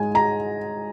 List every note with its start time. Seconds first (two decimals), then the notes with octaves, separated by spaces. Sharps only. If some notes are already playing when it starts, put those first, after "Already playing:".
Already playing: G#2 G#3 G#5
0.14 G#3 A#5